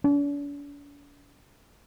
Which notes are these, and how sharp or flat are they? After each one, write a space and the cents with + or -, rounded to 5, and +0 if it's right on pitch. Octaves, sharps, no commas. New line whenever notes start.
D4 -45